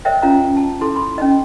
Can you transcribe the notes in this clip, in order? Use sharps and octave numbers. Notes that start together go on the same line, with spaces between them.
A#4 C5 C#5 D#5 E5 G5
C#4 F4 D#5 F5 A#5
A5
E4 A4 C6
B5 C6
C#4 D#4 D#5